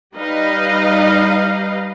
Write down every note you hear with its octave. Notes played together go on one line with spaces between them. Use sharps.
G3 D#4 B4 D#5 F5